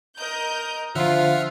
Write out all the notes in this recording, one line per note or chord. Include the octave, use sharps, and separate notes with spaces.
A#4 D#5 G6
D3 F3 F4 E5 F#5 F6